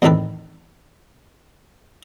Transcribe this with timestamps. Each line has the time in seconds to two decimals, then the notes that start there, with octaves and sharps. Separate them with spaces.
0.02 E2 A2 D#3 C4 A4 B4